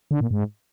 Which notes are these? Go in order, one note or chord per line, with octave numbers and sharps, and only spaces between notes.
D3
A#2
G#2